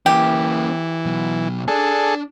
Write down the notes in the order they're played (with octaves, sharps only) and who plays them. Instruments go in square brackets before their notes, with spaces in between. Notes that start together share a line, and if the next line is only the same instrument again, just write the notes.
[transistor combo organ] E3 [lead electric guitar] A#3 C#4 [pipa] G4
[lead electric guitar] B2 F#3
[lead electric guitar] D4 D5 [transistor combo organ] G#4 A4